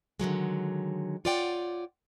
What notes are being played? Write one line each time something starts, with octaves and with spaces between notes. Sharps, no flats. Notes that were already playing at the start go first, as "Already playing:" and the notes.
D3 D#3 F#3 G#3
F4 C#5 D5 F#5 G5